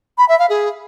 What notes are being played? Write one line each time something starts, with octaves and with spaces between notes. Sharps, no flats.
B5
E5
F5
G#4